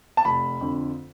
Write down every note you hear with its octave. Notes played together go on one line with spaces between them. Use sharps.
A5
F1 B5
F2 D3